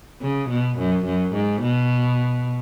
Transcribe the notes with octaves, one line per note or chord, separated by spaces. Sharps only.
C#3
B2
F#2
F#2
G#2
B2